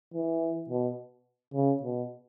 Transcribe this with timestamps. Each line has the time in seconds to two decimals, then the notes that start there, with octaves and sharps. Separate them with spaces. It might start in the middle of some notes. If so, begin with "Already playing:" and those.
0.14 E3
0.69 B2
1.54 C#3
1.83 B2